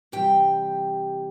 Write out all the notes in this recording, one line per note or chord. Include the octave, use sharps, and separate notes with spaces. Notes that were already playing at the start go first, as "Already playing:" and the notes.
C3 E3 G3 G4 G5